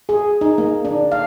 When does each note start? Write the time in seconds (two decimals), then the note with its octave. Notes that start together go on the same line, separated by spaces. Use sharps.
0.09 G#4
0.41 D#4
0.58 A#3
0.85 D4
1.12 F5